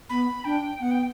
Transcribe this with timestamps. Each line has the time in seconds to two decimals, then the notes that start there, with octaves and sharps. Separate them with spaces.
0.09 B3 B5
0.45 D4 G5
0.80 B3 F#5
0.91 G5